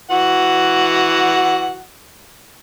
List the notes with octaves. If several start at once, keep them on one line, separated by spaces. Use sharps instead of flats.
E3 F#4 F#5